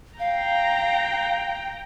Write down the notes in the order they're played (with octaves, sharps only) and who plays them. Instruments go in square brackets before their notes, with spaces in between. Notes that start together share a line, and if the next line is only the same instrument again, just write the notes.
[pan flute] F5 [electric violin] G5 A#5